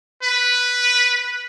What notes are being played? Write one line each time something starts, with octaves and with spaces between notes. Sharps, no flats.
B4